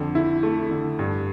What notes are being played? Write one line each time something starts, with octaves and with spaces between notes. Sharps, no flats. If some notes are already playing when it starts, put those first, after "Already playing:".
Already playing: F2 D3
E4
A3
D3
G2